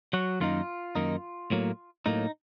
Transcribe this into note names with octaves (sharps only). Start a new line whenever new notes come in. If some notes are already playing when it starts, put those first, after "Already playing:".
F#3 F#4
F#2 D#3 A#3 D#4 F4
F#2 D#3 A#3 D#4
A2 F#3 A#3
A2 F#3 A#3 D#4